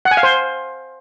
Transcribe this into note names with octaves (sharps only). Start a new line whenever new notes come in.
F#5
G#5
F5
C5